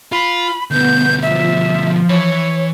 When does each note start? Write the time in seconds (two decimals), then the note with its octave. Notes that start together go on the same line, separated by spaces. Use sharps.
0.12 F4 B5
0.71 D2 B2 B3 G6
1.22 F3 E5
2.09 E3 C#5 B5